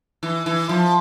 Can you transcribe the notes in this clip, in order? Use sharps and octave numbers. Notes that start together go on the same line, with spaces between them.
E3
E3
F3